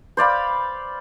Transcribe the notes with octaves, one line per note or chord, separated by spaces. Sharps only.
C5 D5 F5 B5